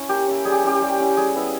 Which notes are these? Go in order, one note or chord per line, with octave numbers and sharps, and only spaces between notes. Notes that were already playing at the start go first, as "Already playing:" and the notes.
Already playing: C#4 E4
A#3 G4
C#4 E4
G3 G#4
G4
C#4 E4 G4
G3
C#4 E4
G3 G#4
B3 E4